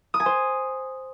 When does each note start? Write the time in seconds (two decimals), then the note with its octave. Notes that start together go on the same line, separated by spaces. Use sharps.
0.14 D#6
0.20 G#5
0.26 C5